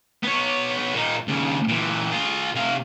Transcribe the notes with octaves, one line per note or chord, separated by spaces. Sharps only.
B3 C#5
A#2 D#4
D#2 C#3
A#2 E3
F4 G#4
C3 F5